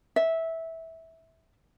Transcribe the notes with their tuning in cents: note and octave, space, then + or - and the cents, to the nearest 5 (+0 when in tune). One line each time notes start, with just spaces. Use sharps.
E5 -15